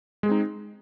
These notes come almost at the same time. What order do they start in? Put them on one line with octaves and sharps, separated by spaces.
G#3 G#4 C4 D#4